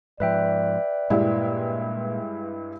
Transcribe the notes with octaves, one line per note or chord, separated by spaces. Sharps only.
G#2 F3 B4 D5 E5 G5
G2 A#2 G#3 E4